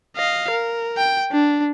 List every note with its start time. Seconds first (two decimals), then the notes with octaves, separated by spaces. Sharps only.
0.16 D#5 F5
0.51 A#4
0.97 G5
1.32 D4